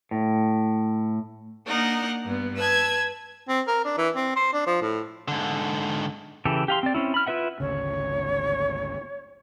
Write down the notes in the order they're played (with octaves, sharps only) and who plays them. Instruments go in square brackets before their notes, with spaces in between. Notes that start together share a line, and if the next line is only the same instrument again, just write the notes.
[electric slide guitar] A2
[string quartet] A#3 D4 D#4 A#4 F#5
G2 B3
B4 A5 E6 G#6
[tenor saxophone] C4
A#4
D4
E3
C4
C5
D4
F3
A2
[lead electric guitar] G#2 D3
[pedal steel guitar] C#3 E3 G4 A4
G4 F5 C6
C4 D5
C4 C#4 E4
B5 F6
E4 F4 B4 E5 F#5
[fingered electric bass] G#1 D2 C#3 [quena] C#5